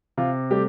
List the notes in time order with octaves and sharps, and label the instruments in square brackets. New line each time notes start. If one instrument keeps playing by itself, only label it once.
[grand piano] C3 F4
G3 A3 G4